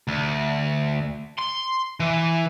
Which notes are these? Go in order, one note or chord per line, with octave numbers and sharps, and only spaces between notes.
D2
C6
E3